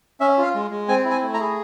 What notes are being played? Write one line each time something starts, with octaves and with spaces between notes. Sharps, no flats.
C#4 E5
F4 F5
G#3
G#3
C4 G#5
E4
G#5
A3
A#5
G#4